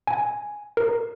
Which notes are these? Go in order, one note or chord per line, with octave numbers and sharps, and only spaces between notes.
G#5
A#4